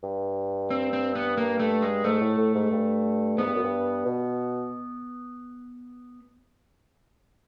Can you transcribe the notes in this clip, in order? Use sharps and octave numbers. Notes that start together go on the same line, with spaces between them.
G2
C4
C4
B3
A#3
A3
G#3
G#2 A3
A2
A2
G#2
G2
G#2 B3
G2
F#2
G2
B2